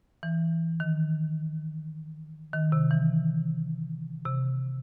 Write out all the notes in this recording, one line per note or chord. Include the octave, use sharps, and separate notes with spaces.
E3
D#3
D#3
C3
E3
C3